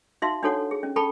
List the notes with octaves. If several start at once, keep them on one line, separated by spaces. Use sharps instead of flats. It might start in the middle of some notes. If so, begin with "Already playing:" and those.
D#4 F#4 E5 F5 C6
D4 D#4 F#4 A4 C#5 F#5
G#4
C#4
A4 G5 A5 B5 C#6